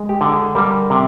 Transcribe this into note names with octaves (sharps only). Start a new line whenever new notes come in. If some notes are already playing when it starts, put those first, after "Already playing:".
Already playing: G#3
G4
D3
G#4
G3 A#4
C3